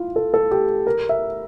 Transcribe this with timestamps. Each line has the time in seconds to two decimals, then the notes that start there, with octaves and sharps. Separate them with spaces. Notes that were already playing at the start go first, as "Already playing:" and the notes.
Already playing: E4 F4
0.16 A4
0.34 A4
0.51 G4
0.87 A#4
1.09 E5